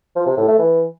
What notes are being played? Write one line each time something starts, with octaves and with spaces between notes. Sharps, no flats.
F3
C3
A2
A3
E3